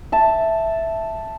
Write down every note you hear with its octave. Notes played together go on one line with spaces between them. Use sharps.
E5 A5